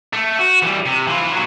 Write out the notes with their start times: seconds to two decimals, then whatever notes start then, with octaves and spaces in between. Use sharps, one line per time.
0.13 A3
0.38 F#4
0.62 E3 G3
0.86 C3
1.07 E3 F4
1.33 A#2 F#3